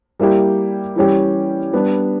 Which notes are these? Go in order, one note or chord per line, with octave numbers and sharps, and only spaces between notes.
G3 A#3 E4 G4
E3 G3 C#4 G4
G3 B3 D4